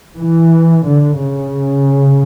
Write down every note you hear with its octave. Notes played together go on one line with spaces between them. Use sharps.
E3
D3
C#3